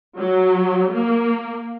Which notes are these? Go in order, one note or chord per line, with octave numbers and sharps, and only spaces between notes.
F#3
A#3